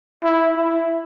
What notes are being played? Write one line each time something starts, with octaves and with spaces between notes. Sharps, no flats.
E4
E4